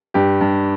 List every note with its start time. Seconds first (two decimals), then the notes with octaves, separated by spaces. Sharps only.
0.14 G2 G4
0.41 G2